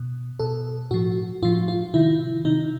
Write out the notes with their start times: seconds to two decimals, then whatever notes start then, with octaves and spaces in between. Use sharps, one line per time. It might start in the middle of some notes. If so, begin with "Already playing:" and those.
Already playing: B2
0.39 B2 A4
0.91 A2 F3 F#4
1.42 A2 F3 F4
1.68 F4
1.94 C3 D#3 E4
2.45 C3 D#3 D#4